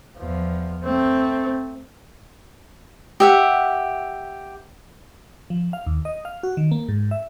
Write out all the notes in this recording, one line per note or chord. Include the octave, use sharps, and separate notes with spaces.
E2 F3
A3 C4
G4 E5 F#5
F3
F5
D#2
D#5
F5
F#4
D#3
A#3
G#2
E5